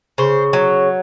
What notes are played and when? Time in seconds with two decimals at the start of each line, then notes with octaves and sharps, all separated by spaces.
0.18 C#3 C5
0.53 F#3